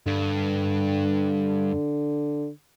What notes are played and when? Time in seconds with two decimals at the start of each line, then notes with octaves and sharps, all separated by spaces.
0.07 G2 D3